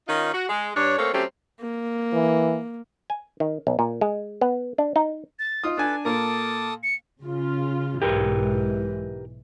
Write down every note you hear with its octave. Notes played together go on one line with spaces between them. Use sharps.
D#3 C#4 D#4 F4
F#4
G#3
G2 D4 C#5
A3 A#3 C4 A4 C#5
F#3 A3 C4 C#4 G4
A#3
E3
G#5
D#3
B1
A#2
G#3
B3
D4
D#4
A6
D#4 F4 D#6
D4 A4 B4 G#5 A6
A#2 A4 A#4 A5 D6 D#6
C#7
C#3 F4
B1 G#2 E3 G4 A#4 B4